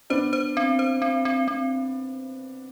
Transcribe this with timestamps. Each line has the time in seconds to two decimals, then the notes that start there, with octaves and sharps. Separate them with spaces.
0.10 B3 D4 C5
0.33 C5
0.57 C4
0.79 C5
1.02 C4
1.25 C4
1.48 C4